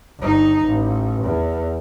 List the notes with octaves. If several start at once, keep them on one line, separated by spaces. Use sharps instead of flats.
G1 D#4
A1
E2